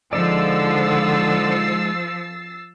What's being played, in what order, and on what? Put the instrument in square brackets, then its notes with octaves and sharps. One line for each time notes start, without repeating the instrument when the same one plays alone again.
[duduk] D3 [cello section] F3 [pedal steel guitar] G#3 D#4 D5 [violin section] E6 A6 C7